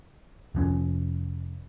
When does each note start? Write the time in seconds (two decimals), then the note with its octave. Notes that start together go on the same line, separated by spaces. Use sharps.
0.55 F1 F3 C#4